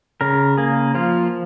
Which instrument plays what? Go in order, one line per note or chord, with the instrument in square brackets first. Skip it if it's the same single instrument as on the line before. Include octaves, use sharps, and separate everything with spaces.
[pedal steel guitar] C#3 A#4
A#3 G#4
F3 F4